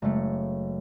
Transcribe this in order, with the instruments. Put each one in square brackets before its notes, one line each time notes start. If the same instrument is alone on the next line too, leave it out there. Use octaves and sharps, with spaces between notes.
[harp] F#1 G#3 A3 C#7